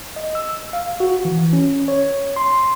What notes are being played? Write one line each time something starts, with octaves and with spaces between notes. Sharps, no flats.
D#5
E6
F5
F#4
E3
C#4
C#5
C6